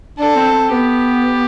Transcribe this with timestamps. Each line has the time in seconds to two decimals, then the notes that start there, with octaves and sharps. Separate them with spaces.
0.18 D4 A4
0.36 C4
0.54 C4
0.71 B3 G4